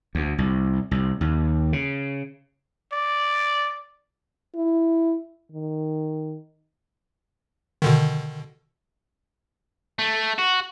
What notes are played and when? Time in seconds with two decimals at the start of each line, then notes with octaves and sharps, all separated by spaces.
0.15 D2
0.38 C2
0.91 C2
1.21 D#2
1.73 C#3
2.92 D5
4.55 E4
5.52 D#3
7.82 B2 D3 D#3
9.99 A3
10.39 F#4